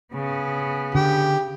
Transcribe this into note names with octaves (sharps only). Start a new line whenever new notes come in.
C#3 B3
D3 G4